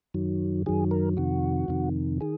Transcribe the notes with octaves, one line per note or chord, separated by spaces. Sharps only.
F#2 D#3 F#3
F#2 D#3 F#3 G#4
A#4
F2 C3 D#3 F#4
F2 C3 D#3
D#3 G#4